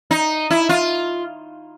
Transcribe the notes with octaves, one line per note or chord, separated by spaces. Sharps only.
D#4
E4
F4